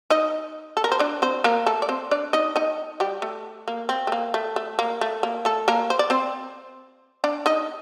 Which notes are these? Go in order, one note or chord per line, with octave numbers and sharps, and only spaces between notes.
D#4 D#5
A4
A#4
C5
D4 D5
C4 C5
A#3 A#4
A3 A4
D5
C4 C5
D4 D5
D#4 D#5
D#4 D#5
G3 G4
A3
A#3
C4
A3
A#3
A3
A3
A#3
A3
A#3
A3 A4
A#3 A#4
C5
D5
C4 C5
D4 D5
D#4 D#5